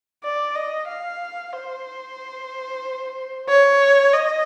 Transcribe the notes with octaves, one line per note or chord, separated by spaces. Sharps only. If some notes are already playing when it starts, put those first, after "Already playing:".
D5
D#5
F5
C5
C#5
D#5